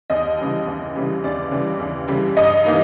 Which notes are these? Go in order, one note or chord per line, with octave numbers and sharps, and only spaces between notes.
D#2 D#5
C#3 E3 G3
D#2
C#3 E3 G3
D#2 D5
C#3 E3 G3
D#2
C#3 E3 G3
G2 D#5
E3 G3 A#3 D#4